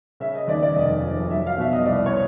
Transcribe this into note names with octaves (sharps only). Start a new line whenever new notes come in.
C#3 E5
D#5
D#2 D5
D5
F1 D#5
F3
F#3 E5
F5
B2 E5
D#5
C2 D5
C#5